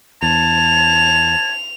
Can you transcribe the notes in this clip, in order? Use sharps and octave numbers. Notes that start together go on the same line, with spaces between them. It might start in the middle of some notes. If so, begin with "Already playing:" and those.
E2 A5 G#6 F7